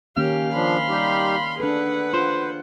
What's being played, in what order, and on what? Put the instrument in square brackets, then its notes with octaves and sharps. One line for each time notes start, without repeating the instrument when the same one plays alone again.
[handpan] D#3 A#3 C#4 [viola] G4 [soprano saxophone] F5
[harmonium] F3 D4 [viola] B5 C6
[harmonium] G3 D#4 G4
[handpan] D4 A4 [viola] G#4 F#5 [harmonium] B4
[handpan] F4 [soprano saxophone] C5